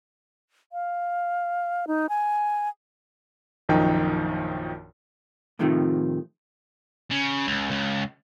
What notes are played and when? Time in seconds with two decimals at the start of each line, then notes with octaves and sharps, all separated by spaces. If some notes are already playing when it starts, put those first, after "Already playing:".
0.73 F5
1.87 D#4
2.09 G#5
3.69 A#1 F#2 D#3 F3 D#4 G5
5.59 A2 C3 D#3 F3 G3 A3
7.11 C#3
7.47 C#2
7.71 C#2